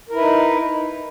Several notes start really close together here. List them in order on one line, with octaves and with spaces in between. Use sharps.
A#4 E4 B4 D#4